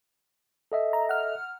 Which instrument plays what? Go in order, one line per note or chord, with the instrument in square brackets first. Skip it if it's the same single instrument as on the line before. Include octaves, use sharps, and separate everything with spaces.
[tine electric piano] A4 D#5 E5
[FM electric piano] A#5
F#5 F6